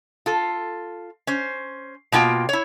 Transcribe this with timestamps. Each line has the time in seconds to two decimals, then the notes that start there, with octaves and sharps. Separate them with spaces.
0.26 F4 A4
1.27 C#4 C5
2.12 B2 A#3 F4 G5
2.49 E4 C#5